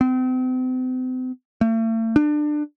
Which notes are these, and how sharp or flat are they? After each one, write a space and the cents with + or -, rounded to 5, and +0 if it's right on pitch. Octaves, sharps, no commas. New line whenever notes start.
C4 -40
A3 +40
D4 +25